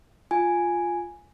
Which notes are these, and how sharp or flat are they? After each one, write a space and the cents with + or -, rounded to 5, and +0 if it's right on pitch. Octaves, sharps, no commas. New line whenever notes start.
F4 +0 G#5 +0